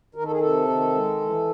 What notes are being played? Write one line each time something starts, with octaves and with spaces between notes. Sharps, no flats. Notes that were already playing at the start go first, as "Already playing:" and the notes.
D#3 A#4
A4
G#4
C3 A4
D#3
G#3
E3